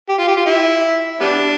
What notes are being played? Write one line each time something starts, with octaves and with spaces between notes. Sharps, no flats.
G4
F4
G4
F4
E4
G3 B3 D4